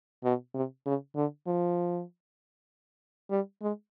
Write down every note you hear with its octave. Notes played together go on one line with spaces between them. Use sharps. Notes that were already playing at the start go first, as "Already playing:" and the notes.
B2
C3
C#3
D3
F3
G3
G#3